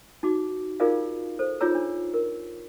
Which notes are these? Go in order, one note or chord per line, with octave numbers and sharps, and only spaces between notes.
D#4 F#4 D6
D#4 F4 G#4 A#4 D5 F5
A4 C5
D#4 F4 G#4 C#5 A#5 E6
D4
A#4